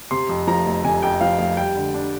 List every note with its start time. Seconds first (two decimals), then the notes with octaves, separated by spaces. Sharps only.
0.11 C3 C6
0.29 F2
0.47 F3 A#5
0.66 F1
0.84 C3 G#5
1.02 F2 G5
1.21 F3 F5
1.39 F1 F5
1.57 G3 G5
1.76 D3
1.94 D4